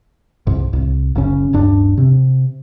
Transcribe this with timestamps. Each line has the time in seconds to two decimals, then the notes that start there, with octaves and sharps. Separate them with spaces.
0.47 C2 G#2
0.73 C2
1.15 F#1 C#3 C#4
1.53 D1 G2 D4
1.97 C3